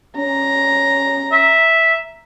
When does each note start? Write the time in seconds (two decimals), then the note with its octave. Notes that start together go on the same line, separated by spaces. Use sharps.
0.17 C#4 A#5
1.32 E5